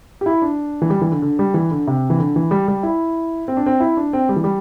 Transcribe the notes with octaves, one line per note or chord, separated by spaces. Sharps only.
G4
E4
D4
E3
G3
E3
D3
D3
G3
E3
D3
C3
E3
D3
E3
G3
G3
E4
C4
D4
C4
E4
D4
C4
G3
E3
G3